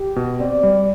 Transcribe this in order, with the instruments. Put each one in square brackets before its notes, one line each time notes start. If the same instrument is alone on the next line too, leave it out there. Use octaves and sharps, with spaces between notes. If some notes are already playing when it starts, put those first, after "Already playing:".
Already playing: [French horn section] G4
[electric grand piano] B2
[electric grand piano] C4 [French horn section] D5
[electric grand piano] G3